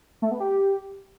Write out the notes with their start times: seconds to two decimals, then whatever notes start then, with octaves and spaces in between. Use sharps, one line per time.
0.22 A3
0.31 B3
0.40 G4